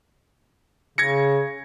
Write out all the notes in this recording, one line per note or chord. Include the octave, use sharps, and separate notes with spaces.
C#3 G#6 A#6 C#7